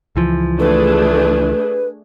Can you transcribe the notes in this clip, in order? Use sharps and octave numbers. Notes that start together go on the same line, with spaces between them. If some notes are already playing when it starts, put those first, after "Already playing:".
C#2 E3 F3
A3 D4 G#4 B4